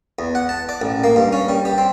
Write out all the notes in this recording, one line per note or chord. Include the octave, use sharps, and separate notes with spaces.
E2
F#5
A5
D5
A1
A#3
G2
C#4
G3
G4
C4